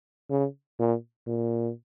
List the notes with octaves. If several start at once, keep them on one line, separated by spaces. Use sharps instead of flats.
C#3
A#2
A#2